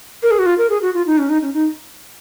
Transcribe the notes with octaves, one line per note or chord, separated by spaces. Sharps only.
A#4
G#4
F#4
F4
A#4
G#4
F#4
F4
D#4
C#4
D#4
C#4
D#4